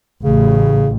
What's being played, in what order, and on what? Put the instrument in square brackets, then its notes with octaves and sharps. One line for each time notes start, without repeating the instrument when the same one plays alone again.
[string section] A1 [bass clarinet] C#3